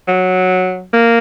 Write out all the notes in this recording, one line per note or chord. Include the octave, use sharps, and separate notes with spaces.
F#3
A#3